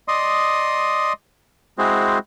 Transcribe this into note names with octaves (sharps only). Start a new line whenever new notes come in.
D5 D#5 C6 D#6
G#3 C4 E4 F#4 G#4 C5